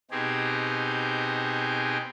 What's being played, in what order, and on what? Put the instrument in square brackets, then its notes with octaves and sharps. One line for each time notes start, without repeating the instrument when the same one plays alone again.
[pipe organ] B2 C4 D#4 G4 G#4